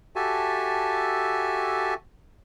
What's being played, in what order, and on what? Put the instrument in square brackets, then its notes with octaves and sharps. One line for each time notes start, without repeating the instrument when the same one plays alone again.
[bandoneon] F#4 G4 A4 E5 G#5 A5